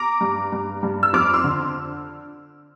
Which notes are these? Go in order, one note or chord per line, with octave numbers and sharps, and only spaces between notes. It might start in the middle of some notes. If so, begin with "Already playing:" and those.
Already playing: A#5 D6
G2
G2
G2
E6
F2 D6 F6
C6 E6
D3